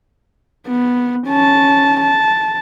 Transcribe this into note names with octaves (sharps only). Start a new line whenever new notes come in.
B3
C#4 A5
A5